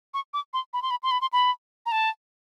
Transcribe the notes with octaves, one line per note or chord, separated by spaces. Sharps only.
C#6
D6
C6
B5
C6
B5
C6
B5
C6
B5
A#5
A5